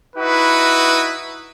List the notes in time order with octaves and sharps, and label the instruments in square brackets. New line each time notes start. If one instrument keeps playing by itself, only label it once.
[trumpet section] D#4 E4 F#4 B4